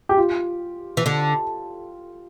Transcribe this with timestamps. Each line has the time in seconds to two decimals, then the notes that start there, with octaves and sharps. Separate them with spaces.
0.09 G4
0.17 F4
0.97 E3
1.06 D3